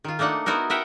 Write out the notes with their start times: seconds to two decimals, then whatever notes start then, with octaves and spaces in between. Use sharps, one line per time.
0.04 D#3 F4
0.19 A3 A#3 D4 D#4 F#5
0.46 B3 D#4 E4 F#4 A#4
0.70 A#4 B4 E5 F#5 G5